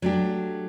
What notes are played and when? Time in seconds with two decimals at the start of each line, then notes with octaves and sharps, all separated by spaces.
0.02 F#3 A3 D4 G4